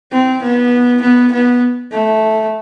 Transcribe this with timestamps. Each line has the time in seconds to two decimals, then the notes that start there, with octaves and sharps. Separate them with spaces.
0.12 C4
0.43 B3
1.02 B3
1.33 B3
1.92 A3